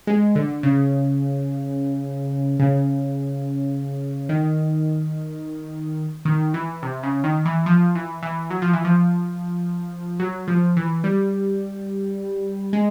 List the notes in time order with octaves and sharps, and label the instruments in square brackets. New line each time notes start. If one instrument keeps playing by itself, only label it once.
[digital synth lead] G#3
D3
C#3
C#3
D#3
D#3
E3
C3
C#3
D#3
E3
F3
E3
E3
F#3
F3
E3
F3
F#3
F3
E3
G3
G#3